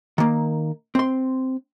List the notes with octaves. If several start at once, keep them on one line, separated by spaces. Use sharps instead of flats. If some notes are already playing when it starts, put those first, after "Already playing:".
D#3 A#3
C4 C6